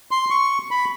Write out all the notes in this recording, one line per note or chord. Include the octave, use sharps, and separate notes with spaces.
C6
C#6
B5